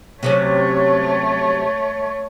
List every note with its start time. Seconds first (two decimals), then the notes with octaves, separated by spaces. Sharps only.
0.23 C3 F#3 A3 C#4 C#5